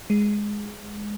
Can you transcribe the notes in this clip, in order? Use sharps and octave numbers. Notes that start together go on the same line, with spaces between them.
G#3